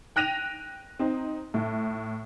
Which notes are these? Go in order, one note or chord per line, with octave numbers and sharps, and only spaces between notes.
G5 F#6 A#6 D#7 F7
C4 D#4
A2